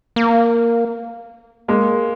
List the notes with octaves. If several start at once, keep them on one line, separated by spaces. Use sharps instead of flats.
A#3
G#3 A#3